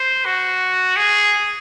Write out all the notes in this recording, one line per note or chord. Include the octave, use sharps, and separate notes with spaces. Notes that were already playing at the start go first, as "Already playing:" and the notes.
Already playing: C5
F#4
G#4